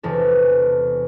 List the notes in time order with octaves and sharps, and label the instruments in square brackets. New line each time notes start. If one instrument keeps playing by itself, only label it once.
[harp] E1 E2 C3 A4